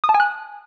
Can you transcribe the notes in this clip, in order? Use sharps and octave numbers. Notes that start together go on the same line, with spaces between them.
D#6
A5
G#5
F#6